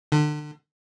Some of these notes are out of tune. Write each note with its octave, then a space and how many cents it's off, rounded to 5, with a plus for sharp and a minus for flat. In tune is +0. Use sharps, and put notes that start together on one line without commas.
D3 +35